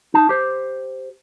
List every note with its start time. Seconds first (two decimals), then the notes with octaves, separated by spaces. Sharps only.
0.14 D#4 A5
0.29 G4 C5